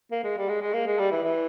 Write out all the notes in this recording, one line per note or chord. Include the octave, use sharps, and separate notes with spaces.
A#3
G#3
G3
G#3
G#3
A#3
G#3
G3
E3
E3